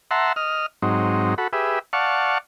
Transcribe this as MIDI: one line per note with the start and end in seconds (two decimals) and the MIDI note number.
0.11 0.33 76
0.11 0.33 78
0.11 0.33 81
0.11 0.33 82
0.11 0.33 84
0.36 0.66 75
0.36 0.66 89
0.82 1.34 44
0.82 1.34 54
0.82 1.34 60
0.82 1.34 63
1.38 1.48 66
1.38 1.48 69
1.38 1.48 83
1.53 1.79 67
1.53 1.79 68
1.53 1.79 71
1.53 1.79 76
1.93 2.38 74
1.93 2.38 77
1.93 2.38 78
1.93 2.38 81
1.93 2.38 85